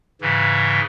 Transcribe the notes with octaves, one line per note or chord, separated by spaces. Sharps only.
G#2 C#3 E3